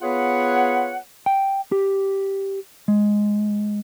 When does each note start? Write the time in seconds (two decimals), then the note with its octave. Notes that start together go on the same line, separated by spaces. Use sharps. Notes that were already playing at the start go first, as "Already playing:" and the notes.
0.02 B3 F4 G#4 B4 C#5 F#5
1.26 G5
1.72 G4
2.88 G#3